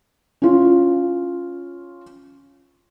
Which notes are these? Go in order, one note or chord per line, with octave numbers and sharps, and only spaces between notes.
C#4 F4